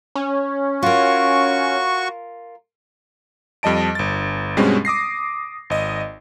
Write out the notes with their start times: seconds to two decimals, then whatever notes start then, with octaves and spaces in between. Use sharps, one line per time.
0.15 C#4
0.83 F4 F#4 A#4 C#6
3.63 F2 G3 D#5 A5 D7
3.95 G1 A6
4.57 G2 B2 G3 G#3 C4 C#4
4.85 D6 D#6 A#6 C7
5.70 G#1 D#5